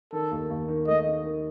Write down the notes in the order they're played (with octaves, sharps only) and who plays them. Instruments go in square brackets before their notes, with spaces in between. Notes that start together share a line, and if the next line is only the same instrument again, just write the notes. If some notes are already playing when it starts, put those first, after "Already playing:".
[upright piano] D#3 [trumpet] A4
[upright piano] D#2
D#2
D#3
[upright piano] A3 [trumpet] D#5
[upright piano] D#3
D#3